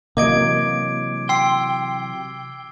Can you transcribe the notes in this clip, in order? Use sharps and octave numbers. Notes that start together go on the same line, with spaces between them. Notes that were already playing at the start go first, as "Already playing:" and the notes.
C3 E3 F#3 A#3 D#5 D6 G#6 D7
G5 C6 E6 C7